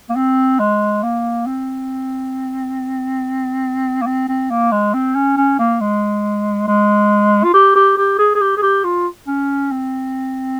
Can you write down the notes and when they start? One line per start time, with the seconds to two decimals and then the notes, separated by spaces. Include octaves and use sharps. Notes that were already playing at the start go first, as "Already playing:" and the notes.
0.10 A#3
0.16 C4
0.60 G#3
1.03 A#3
1.47 C4
4.02 A#3
4.07 C4
4.29 C4
4.51 A#3
4.72 G#3
4.94 C4
5.15 C#4
5.37 C#4
5.59 A#3
5.81 G#3
6.68 G#3
7.44 F4
7.54 G4
7.76 G4
7.98 G4
8.19 G#4
8.35 G#4
8.41 G4
8.57 G#4
8.63 G4
8.84 F4
9.27 C#4
9.71 C4